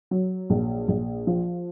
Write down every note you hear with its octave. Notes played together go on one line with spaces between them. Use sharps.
F#3
A#1
A#1
F3